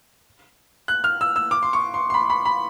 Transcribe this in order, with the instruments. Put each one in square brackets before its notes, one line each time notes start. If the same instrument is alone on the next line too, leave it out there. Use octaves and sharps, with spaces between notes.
[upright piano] F#6
F6
E6
E6
D6
C6
C#6
C6
C6
B5
B5
B5